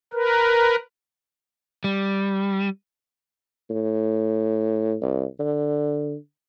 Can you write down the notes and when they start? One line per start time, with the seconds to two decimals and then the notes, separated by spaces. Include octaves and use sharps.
0.13 A#4 B4
1.84 G3
3.70 A2
5.02 C2
5.40 D3